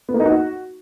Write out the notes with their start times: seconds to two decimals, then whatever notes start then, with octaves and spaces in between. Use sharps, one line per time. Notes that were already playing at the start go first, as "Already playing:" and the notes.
0.09 B3
0.14 A#3
0.20 D#4
0.26 F#4